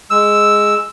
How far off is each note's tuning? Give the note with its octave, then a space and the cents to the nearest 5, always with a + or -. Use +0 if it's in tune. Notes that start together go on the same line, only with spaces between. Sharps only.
G#3 +0 E6 +0